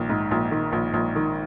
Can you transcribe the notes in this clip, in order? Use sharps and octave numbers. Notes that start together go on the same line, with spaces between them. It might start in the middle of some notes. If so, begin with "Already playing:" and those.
Already playing: A#1 D#3
G#2
A#1
D#3
A#1
A#1
D#3